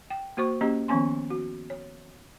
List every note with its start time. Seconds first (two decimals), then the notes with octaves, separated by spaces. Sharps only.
0.10 G5
0.37 A#3 F#4 C5 C#6
0.61 A#3 C#4 G4 D#5 A#5
0.88 D#3 F3 B3 C#4 G#5 C6
1.30 F#4
1.70 C#5